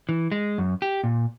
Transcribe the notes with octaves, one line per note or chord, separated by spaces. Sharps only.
E3
G#3
F#2
G4
A#2